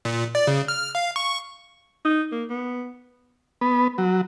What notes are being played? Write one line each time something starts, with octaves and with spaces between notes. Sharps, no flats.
A#2
D5
C#3
F6
F5
C#6
D#4
A#3
B3
B3
F#3